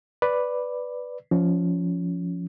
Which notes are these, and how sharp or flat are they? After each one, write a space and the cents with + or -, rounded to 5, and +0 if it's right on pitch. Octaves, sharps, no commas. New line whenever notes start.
B4 +0 D5 +0
F3 +0 C#4 +20